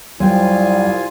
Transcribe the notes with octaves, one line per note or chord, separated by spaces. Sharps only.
C2 F2 F#3 G3 F4 G5 G#5